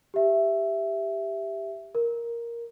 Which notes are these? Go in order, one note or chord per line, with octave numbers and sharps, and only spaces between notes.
G4 E5
A#4